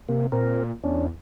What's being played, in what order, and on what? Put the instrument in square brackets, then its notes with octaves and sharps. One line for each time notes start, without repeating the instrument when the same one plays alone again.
[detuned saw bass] C3 [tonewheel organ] A#3
[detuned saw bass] A#2 [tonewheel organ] C4 A#4
[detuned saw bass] E2 [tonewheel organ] C#4 D4